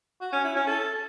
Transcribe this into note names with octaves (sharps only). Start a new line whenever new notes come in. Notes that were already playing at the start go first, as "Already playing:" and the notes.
F#4
C#4
E4
C#4
A4